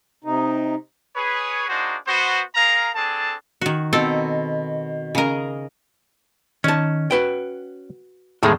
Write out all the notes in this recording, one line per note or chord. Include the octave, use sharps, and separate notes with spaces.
C3 D#4
G#4 B4 C#5
A#3 D4 D#4 F#4 G#4 C5
B3 F#4 C5
G#4 A#4 F5 A#5
C4 D4 G#4 A4 A5
D#3 F#4
B2 D#3 C4 A4 A#5
C#3 G#4 A#4 D#5 A#5
D#3 C#4 A5
F#4 B4 G5
E2 A2 D#3 G#3 G#4 A4